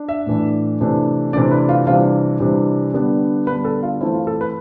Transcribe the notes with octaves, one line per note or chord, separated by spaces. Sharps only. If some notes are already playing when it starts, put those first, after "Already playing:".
Already playing: D4
E5
A2 E3 A3 D4
C3 E3 A3 D4
C3 E3 A3 D4 D5
B4
F4
C3 E3 G3 D4 F4
C3 E3 G3 D4
D3 G3 B3 D4
D3 G3 B3 D4 B4
A4
F4
E3 A3 C4 E4
F4
A4
B4